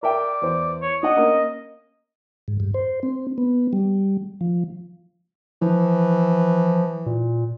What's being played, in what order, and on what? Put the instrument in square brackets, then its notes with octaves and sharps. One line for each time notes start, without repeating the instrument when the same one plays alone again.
[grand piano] A#4 E5 G5 [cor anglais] D5
[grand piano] E2 C5
[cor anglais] C#5
[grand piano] D4 F#5 [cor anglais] D#5
[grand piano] A#3 C#4 A#4
[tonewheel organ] G#2
G2
C5
C4
B3
G3
F3
[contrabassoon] E3 [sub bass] F3
[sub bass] A#2